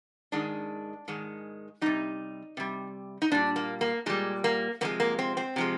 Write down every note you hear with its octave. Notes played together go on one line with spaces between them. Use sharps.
G#2 D#3 G#3 D4
G#2 D#3 G#3
C3 G3 D#4
C3 G3
D#4
A#2 G3 D4
A#3
A#3
A#2 G3 G#3
A#3
C3 F3 G#3 A#3
A#3
C4
C4
C3 F3 G#3